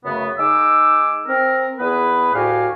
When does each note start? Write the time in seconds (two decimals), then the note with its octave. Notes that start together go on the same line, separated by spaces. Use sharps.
0.04 F#2 C#3 A3 B3
0.38 G#3 D#4 D6 E6
1.27 C4 A#4
1.79 E2 B3 G#4 B4
2.34 D2 A2 F#4 G4 F5 G#5